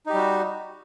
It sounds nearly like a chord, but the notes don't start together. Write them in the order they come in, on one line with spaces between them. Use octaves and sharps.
D#4 G4 G3 F#4